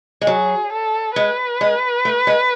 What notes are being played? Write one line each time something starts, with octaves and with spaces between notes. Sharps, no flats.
G#3
F#3 G#4
A4
G#3 B4
G#3
A3
G#3